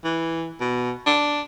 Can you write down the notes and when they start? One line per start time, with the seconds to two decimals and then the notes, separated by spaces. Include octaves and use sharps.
0.05 E3
0.60 B2
1.06 D4